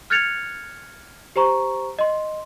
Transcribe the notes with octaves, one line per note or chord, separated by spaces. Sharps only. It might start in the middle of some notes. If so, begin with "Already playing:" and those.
F6 F#6 G#6 A6 C#7 F7
G4 C5 A#5 C#6
D#5 C6